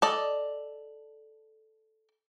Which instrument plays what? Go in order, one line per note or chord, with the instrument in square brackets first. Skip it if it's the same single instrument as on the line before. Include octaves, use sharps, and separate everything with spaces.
[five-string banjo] A4 D5 D#5